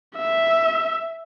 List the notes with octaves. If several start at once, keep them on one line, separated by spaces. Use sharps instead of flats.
E5